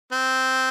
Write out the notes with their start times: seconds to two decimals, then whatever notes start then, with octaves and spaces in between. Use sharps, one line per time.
0.12 C4